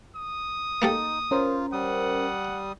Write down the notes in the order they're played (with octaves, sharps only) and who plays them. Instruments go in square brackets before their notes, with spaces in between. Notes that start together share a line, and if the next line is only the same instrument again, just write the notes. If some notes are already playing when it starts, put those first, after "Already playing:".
[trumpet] D#6
[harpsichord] A#3 G4 A4 [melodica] D#4
[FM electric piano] C#4 A#4 C5 [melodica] F4
[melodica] G3 D#6 [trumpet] F#5